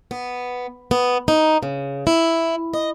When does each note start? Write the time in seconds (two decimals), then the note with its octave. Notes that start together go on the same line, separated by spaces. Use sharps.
0.11 B3
0.91 B3
1.28 D#4
1.63 C#3
2.07 E4
2.73 D#5